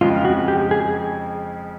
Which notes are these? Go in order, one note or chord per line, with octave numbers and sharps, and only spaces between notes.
F2 C#3 F3 G#3 F4
F#4
G4
G#4